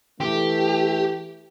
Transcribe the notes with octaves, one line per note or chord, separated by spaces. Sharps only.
E3 A3 G4